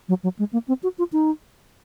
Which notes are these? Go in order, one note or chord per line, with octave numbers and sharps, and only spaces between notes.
F#3
F#3
G#3
A#3
C4
F#4
F4
D#4